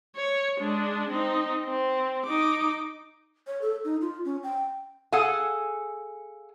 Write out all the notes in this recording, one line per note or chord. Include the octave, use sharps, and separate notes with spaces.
C#5
G#3 D4
C4 D#4
C4
D#4 D6
C#5
A4
D#4
F4
C#4
G5
G#4 A4 F5 F#5 G#5